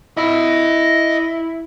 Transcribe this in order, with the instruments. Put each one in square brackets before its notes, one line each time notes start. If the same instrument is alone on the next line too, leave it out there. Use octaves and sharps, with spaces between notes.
[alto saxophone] E4 [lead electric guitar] D#5 B5